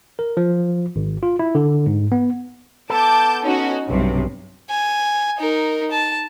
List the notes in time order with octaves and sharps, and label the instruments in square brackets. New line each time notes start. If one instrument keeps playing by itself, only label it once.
[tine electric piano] A#4
F3
G#1
F4
E4
D3
G#2
B3
[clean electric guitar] B3 A4 [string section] A5 D6 G6
[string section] C#4 D#4 F#4
[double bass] B1 [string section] G2 C3
[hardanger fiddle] G#5
D#4 A#4
A5